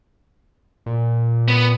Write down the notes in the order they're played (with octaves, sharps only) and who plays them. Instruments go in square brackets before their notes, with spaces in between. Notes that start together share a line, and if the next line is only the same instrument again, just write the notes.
[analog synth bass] A#2
[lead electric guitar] B3